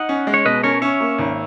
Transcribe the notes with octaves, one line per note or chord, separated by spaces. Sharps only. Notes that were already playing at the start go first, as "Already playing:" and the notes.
Already playing: D#4 D#5 F#5
C#4
G#3
C#5
B2 B4 D#5
C#4 A#4 C#5
C#4 C#5 E5
A#3
G#1